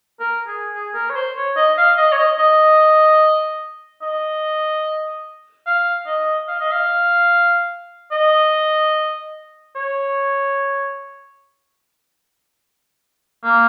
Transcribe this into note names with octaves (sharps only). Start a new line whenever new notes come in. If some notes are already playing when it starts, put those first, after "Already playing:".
A#4
G#4
G#4
A#4
C#5
C5
C#5
D#5
F5
D#5
C#5
D#5
D#5
D#5
F5
D#5
F5
D#5
F5
D#5
C#5
A#3